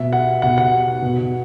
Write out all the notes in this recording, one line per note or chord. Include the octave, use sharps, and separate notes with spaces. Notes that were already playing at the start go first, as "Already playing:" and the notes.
Already playing: B2 E5
F#5
B2 F#5
F#5
B2